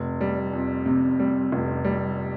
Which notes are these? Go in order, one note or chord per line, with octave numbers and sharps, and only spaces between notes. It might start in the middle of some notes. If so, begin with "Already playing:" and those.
Already playing: F1
G3
F2
C3
G3
F1
G3